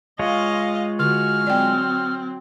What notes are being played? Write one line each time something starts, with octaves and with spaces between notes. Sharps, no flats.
G#3 F4 C#5 D#5 F5
D3 F#4 F6
F#3 C4 D5 G5